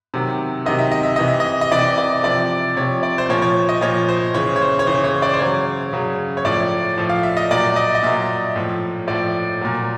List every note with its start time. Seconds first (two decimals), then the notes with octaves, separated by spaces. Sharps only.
0.14 C3 D#3 F#3
0.66 C3 D#3 F#3 D#5
0.79 E5
0.92 D#5
1.03 E5
1.16 C3 E3 D#5
1.28 E5
1.40 D#5
1.61 D#5
1.71 C3 E3 D5
1.98 D5
2.23 C3 F3 D5
2.77 C3 F3 C#5
3.03 D5
3.18 C5
3.29 A#2 F3 C#5
3.42 C#5
3.69 D#5
3.81 A#2 F3 C#5
4.09 C5
4.34 C#3 E3 C#5
4.56 C#5
4.61 C5
4.79 C#5
4.87 C#3 E3 C5
5.04 C#5
5.22 D5
5.33 C5
5.39 C#3 F#3 C#5
5.93 C#3 F#3
6.37 C#5
6.45 A2 F3 D5
6.98 A2 F3
7.09 F5
7.23 E5
7.37 D#5
7.51 A#2 F#3 D5
7.76 D#5
7.95 D#5
8.03 A#2 F#3 E5
8.56 A2 F3
9.08 A2 F3 D5
9.61 A#2 F#3